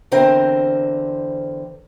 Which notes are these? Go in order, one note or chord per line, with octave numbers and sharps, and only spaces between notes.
E2 D3 C4 A#4 C5